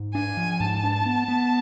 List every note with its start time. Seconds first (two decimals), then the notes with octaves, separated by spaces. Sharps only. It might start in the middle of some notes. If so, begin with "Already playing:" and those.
Already playing: G#2
0.15 D4 G#5
0.37 F3
0.60 G#2 A5
0.83 D4
1.05 B3
1.28 B3